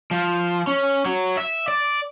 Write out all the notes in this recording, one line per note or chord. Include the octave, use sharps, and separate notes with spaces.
F3
C#4
F#3
E5
D5